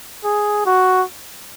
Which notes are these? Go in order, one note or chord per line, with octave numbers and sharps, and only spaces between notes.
G#4
F#4